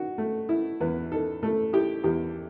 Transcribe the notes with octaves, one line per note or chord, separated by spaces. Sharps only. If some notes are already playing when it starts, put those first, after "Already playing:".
Already playing: D#3 F#4
A3
E4
E2 B4
D#3 A4
A3 A4
E4 G4
E2 G4